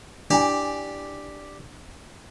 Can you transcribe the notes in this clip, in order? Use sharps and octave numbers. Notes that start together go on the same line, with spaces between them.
D4 E4 G4 D5 G#5